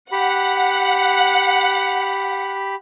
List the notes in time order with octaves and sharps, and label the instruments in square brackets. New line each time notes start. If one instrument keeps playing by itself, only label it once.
[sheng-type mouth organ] G4 B5 [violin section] F#5